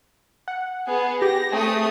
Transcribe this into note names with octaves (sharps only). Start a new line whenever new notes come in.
F#5
B3 G#4
G4 A#6
A3 C4 G#4 D#6